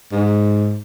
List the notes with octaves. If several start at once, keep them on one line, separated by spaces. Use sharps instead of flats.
G#2